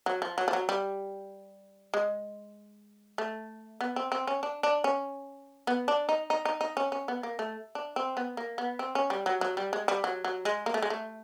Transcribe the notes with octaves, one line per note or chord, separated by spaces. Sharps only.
F#3
F3
F#3
F3
F#3
G3
G#3
A3
B3
C4
C4
C#4
D4
D4
C#4
B3
D4
D#4
D#4
D#4
D#4
C#4
C#4
B3
A#3
A3
D4
C4
B3
A#3
B3
C4
C#4
G3
F#3
F#3
G3
G#3
G3
F#3
F#3
G#3
A#3
A3
G#3
A3